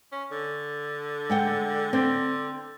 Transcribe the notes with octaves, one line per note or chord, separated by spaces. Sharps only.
C#4
D3
G#3 F#5 G5
D3 C4